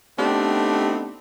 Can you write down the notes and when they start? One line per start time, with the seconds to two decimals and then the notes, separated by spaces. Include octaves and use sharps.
0.19 A3 B3 C4 D4 D#4 G4